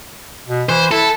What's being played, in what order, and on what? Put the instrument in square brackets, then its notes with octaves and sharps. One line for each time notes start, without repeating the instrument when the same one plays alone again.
[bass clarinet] B2
[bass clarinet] E3 [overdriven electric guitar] C5
[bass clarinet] E4 [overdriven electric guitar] A4